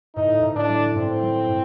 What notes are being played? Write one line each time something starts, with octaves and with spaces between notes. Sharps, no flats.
A2 D#4
A2
D4
G3
A2 C4
G3
A2